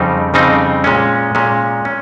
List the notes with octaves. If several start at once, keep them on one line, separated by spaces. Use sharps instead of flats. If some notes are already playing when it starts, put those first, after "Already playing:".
Already playing: F2 C#3 G3 C4 D#4
F2 C#3 G3 C4 D#4
A#2 G#3 C#4
A#2 G#3 C#4
C#4